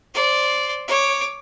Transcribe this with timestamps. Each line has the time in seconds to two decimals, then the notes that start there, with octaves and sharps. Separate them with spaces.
0.14 C5 D5
0.88 C#5 D6